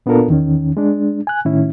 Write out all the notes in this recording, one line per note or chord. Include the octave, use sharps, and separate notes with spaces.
A#2 B3 D4 F4 A4 A#4
E2 D#3 C#4
G#3 D4
G#5 F#6
A2 D#3 C#4 E4